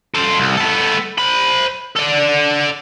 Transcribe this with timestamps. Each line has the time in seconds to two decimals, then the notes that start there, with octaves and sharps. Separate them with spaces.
0.15 A4 C5
0.38 C2
0.57 B3 A4
1.18 C5 B5
1.96 A4 D5